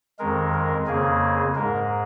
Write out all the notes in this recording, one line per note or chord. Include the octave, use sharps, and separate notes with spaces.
F2 D#3 G#3 A#4
A#4
F2 C#3 A#3 G#4
G#2 G#3 A#4